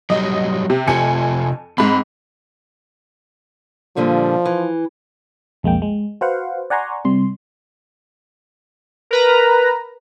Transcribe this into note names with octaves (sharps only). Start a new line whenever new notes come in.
F#3 G3 D#4 D#5
C3
F2 C3 F4 A4 G#5 C#7
G#2 C4 B5
A#2 D3 F3 G3
E3
B1 F2 G#3 A#3 G5
G#3
F#4 B4 C5 F5 F#5
D5 F#5 G#5 A#5 C6 C#6
C3 G3 C6
A#4 B4 A#5